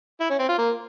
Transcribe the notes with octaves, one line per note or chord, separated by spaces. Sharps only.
E4
C#4
C4
F4
A#3